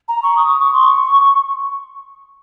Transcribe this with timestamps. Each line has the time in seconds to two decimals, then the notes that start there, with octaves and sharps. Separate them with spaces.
0.08 A#5
0.23 C#6
0.37 D#6
0.60 C#6
0.73 C6
0.87 C#6